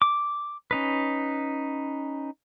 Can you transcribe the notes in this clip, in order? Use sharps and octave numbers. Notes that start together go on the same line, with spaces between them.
D6
C#4 D#4 B4